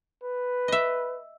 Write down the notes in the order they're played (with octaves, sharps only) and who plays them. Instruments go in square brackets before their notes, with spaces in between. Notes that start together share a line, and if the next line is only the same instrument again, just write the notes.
[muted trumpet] B4
[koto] D#5 E5